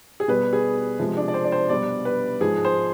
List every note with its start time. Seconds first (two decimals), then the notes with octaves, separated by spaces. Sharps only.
0.20 G#4
0.28 B2 G3 B4
0.53 G#4
0.99 C3 F3 G#3
1.17 D4
1.28 D5
1.34 C5
1.45 D5
1.52 C5
1.69 B2 G3 D5
2.05 B4
2.40 G#2 F3 G#3 G#4
2.65 C5